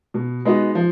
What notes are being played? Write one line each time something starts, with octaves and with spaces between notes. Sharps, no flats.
B2
G#3 B3 D#4 F#4
F3